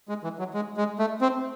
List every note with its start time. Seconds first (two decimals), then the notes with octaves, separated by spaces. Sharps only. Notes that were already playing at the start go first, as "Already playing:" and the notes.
0.09 G#3
0.24 E3
0.39 F#3
0.54 G#3
0.77 G#3
0.99 A3
1.21 C4